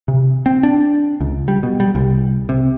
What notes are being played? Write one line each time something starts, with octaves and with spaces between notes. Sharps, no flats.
C3
C4
D4
C#2
G3
B2
G3
C2
C3